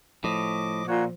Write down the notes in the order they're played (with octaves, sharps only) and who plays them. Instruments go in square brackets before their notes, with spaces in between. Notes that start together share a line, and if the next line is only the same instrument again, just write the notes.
[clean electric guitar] A2 [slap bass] F3 [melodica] D#5 D6
[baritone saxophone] A#2 [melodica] F#4 C#5 F#5